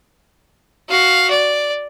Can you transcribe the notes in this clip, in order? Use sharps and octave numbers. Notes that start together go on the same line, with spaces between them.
F#4 F5
D5